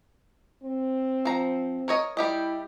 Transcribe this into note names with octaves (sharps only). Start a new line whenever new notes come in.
C4
F3 A#5
A#4 C#5 D#5
G3 E4 G4 D#5